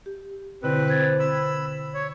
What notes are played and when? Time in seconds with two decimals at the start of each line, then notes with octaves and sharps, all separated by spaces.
0.06 G4
0.63 B2 D3 C4 E4 B4
0.88 C5 G#6 A6
1.20 B5 E6
1.94 C#5